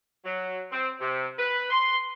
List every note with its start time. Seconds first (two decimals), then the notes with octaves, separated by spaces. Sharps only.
0.25 F#3
0.72 C4
1.00 C3
1.38 B4
1.71 C6